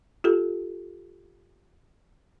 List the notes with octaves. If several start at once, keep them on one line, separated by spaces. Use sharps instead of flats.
F4 G4 A4